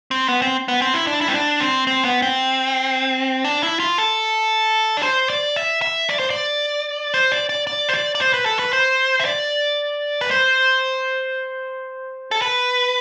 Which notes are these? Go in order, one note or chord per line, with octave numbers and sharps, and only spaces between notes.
C4
B3
C4
B3
C4
E4
D4
E4
C4
D4
C4
C4
B3
C4
D4
E4
F4
A4
D5
C5
D5
E5
E5
D5
C5
D5
C5
D5
D5
D5
C5
D5
D5
C5
B4
A4
B4
C5
E5
D5
B4
C5
A4
B4